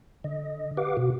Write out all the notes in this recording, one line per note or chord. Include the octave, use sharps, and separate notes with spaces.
D3 D#5
G4 B4 F5 F#5 D6
B2 F#4